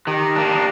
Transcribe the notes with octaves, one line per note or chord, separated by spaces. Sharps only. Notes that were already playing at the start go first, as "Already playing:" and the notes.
D#3 G4
A#3 D4